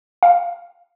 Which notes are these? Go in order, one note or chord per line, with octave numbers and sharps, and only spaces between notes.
F5